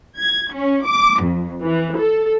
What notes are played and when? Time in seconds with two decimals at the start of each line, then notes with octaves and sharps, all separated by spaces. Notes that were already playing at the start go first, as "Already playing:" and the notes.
0.18 G#6
0.53 C#4
0.86 D6
1.23 F2
1.63 E3
1.98 A4